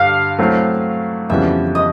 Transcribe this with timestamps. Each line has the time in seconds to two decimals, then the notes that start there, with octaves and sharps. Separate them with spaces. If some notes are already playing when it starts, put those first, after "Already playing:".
Already playing: G2 D3 G3 F5
0.39 F#3 A3 C4 E4
1.29 F2 C#3 E3 G3 B3 E5
1.75 D#5